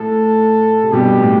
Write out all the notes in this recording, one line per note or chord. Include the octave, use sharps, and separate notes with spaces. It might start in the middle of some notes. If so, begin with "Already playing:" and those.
Already playing: A2 A4
C3
G2 B2 G4
A2